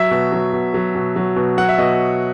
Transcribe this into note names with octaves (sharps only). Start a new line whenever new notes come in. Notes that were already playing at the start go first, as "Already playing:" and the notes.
Already playing: F#3 E5
B2
F#3
B2
F#3
B2
F#3
B2
F#3 F#5
E5
B2 D#5